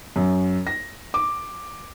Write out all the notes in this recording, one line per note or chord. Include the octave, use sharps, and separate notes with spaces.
F#2
A#6
D6